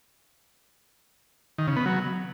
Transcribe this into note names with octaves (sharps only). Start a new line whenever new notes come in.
D#3
C#3
B3
F#3